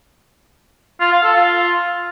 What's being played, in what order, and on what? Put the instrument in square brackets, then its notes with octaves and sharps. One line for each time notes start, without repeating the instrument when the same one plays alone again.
[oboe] F4
F5
A4
F4